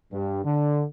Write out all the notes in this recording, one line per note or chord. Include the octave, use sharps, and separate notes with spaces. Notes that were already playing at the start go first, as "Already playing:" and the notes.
G2
D3